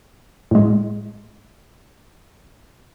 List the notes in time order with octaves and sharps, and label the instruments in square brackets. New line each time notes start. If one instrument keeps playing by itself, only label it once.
[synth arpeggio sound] A2 G#3